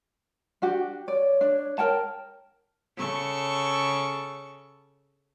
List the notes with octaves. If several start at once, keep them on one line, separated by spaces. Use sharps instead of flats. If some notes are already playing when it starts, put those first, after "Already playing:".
D4 F#4 G4
C#5 D5
D4
A#4 G5 A5
C#3 A4 C#6